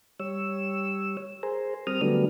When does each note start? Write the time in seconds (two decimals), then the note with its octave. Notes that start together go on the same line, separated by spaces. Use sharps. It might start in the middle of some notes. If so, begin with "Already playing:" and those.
0.20 G3 C#5 E6
1.43 G#4 A#4 C5
1.87 G3 C4 A#4 D#6 F6
2.01 D3 F#3 G3 A3 B3 D4